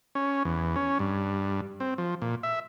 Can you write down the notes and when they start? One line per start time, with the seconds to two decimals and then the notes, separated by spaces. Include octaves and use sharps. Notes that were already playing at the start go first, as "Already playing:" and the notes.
0.15 C#4
0.45 E2
0.76 C#4
0.99 G2
1.80 C4
1.98 F3
2.22 A#2
2.43 E5